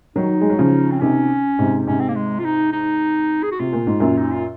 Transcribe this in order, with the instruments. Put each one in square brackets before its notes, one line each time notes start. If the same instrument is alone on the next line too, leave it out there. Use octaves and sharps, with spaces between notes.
[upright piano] D#3 F#3 [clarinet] D#4
[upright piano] G#3
F#3
C#3 F3
[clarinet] C4
[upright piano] C3 D#3 [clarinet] C#4
[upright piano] G#2 C3
[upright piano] G#2 C3 [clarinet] C#4
[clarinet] C4
A#3
G#3
F4
D#4
D#4
G#4
F#4
[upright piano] C3 [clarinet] F4
[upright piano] A#2
G#2
F#2 A#2
[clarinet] D#4
F4